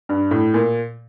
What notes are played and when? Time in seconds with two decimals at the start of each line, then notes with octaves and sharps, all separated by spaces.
0.09 G2
0.31 A2
0.54 A#2